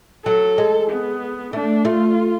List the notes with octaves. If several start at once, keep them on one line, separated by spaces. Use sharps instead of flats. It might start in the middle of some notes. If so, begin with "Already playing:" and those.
F#3 A4
G#3
B3
A3 D4
A3 F4